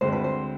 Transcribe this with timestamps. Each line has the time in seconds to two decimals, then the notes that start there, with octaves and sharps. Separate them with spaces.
0.01 D2 D3 G#3 C4 C5
0.12 B4
0.24 C5